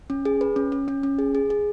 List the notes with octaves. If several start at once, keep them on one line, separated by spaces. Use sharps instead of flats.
C#4
G#4
B4
C#4
C#4
C#4
C#4
G#4
G#4
G#4